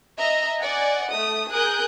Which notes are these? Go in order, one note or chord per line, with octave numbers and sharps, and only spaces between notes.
D#5 E5 A#5
D5 D#5 F#5 G#5
A3 D#6
G#4 A#4 G#5 D#6 F#6 G6